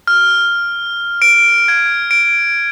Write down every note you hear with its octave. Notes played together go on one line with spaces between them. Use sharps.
F6
D7
G#6
D7